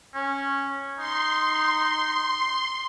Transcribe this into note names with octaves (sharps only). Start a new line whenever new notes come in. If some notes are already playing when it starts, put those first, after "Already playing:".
C#4
D#4 C6